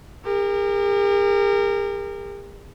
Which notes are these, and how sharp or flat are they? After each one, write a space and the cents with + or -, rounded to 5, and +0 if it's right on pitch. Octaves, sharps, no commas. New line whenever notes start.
G4 +45 A#4 -20